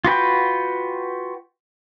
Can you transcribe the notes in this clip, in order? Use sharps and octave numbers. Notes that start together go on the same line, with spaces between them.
F4 F#4 B4 G5